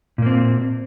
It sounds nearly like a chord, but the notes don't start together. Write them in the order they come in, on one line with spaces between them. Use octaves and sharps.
A#2 A#3 C4